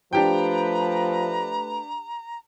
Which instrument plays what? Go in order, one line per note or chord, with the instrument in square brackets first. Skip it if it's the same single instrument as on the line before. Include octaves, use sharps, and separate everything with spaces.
[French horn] F3 [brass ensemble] A3 B4 [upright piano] D4 G4 G5 [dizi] A#5